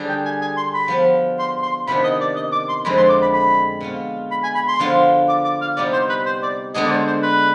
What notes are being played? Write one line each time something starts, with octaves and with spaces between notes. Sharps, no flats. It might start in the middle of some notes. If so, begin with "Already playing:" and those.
Already playing: D3 G3 D4 G#4
G5
G#5
G#5
C6
B5
F3 B3 F4
C6
C6
C3 D#3 B3 D4 B5
D#5
D5
D#5
D6
C6
F2 D3 G#3 C4 B5
C6
D6
B5
B5
B2 B3 F4
B5
G#5
B5
C6
D3 F3 B3 F4
D6
D6
F5
C3 G3 B3 D#4 G4 D5
C5
B4
C5
D5
D3 G#3 B3 D4 G#4 D#5
D5
C5
C5
B4